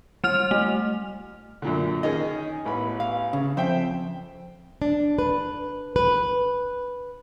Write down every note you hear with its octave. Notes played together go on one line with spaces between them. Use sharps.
G3 F6 F7
A3
F#2 A#2 D3
D#3 C#4 G#4 D#5
A1 B3 B5
F5
C#3
F2 C5 E5 G5
D4
B4
B4